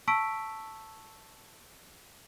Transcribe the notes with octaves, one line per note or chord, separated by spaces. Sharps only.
A5 C#6 E6 B6 D7